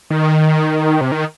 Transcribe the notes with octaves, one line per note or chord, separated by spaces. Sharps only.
D#3
C3
D#3